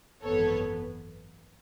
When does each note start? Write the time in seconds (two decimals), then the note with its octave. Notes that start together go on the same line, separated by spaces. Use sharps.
0.22 G#1 F#2 E3 B3 A4 C#5